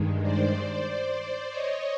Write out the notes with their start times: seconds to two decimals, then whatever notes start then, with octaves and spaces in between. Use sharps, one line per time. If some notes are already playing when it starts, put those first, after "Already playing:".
Already playing: G2 D#3 G#3
0.22 C5 D5
1.50 C#5 D#5